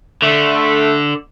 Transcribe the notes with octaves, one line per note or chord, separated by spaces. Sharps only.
D3 A3